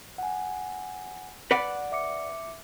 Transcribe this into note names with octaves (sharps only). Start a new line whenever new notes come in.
F#5 G#5
B4 D5 F#5
E5 D6 C#7